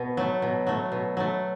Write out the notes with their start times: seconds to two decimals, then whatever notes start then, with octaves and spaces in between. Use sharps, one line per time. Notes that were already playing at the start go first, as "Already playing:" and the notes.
Already playing: B2
0.17 F#3 A3
0.42 B2
0.67 F#3 A3
0.92 B2
1.17 F#3 A3